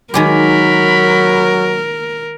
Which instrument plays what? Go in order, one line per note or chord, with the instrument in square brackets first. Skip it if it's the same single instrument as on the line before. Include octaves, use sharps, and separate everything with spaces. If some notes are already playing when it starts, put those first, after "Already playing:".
[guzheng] D#3 G#3 G4 [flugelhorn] F#3 [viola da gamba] A#4 [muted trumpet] B5